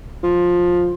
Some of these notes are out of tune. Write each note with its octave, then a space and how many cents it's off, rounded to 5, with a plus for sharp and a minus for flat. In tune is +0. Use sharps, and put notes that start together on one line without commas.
F3 +15